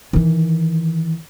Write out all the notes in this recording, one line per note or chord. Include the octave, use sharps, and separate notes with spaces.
D#3 E3